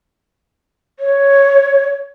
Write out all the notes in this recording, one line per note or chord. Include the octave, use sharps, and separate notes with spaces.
C#5